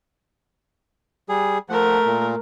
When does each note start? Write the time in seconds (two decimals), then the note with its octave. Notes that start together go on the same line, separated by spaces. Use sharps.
1.29 G3 G#4
1.69 F3 A3 A#4 F#5
2.06 A#2